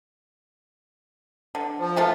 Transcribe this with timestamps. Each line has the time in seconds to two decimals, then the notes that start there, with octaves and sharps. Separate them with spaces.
1.55 D3
1.79 F3
1.96 G#3 A3 F4